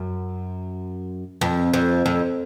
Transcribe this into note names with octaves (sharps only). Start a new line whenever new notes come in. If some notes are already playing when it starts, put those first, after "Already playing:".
Already playing: F#2
F2
F2
F2